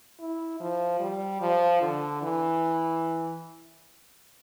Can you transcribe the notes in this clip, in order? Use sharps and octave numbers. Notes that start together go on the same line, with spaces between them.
E4
F3
G3
F3
D3
E3